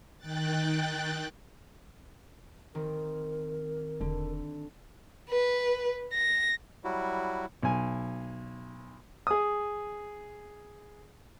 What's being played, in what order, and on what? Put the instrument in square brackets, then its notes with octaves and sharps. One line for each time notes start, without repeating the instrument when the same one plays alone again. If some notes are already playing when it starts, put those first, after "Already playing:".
[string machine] D#3 G5 F#6 A6
[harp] D#3 C4 [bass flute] A#4
[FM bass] E1 [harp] D3
[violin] B4
A#6
[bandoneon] F#3 G3 E4 F#4
[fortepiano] B1 G#5
G#4 D#6